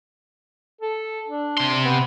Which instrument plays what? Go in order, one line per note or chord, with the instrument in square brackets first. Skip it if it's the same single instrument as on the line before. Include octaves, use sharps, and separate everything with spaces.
[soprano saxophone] A4
D4
[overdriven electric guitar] C3 C6
[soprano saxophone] B3